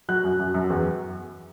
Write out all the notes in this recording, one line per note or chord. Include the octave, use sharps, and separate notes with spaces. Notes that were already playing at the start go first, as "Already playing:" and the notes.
F#3 F#6
F#2
F#2
F#2
E2